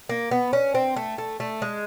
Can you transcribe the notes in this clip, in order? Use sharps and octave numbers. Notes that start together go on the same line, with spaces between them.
A#3
B3
C#4
C4
A3
A3
A3
G#3